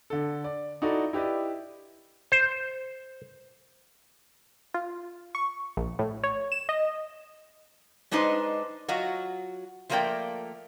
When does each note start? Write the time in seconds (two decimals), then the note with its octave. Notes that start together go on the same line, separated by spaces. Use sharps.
0.10 D3 A4
0.44 D5
0.82 D#4 E4 F#4 A4 D5
1.13 E4 G4 B4 D5 D#5
2.32 C5
4.74 F4
5.35 C#6
5.77 A#1
5.99 A2
6.24 C#5
6.52 E7
6.69 D#5
8.11 G#3 D4 D#4 B4 C5 D#5
8.88 F#3 F4 F#4 D#5
9.89 F3 A3 A#3 C5 D5 G5